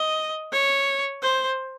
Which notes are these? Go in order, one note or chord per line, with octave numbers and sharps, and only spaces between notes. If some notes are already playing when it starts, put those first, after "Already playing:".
Already playing: D#5
C#5
C5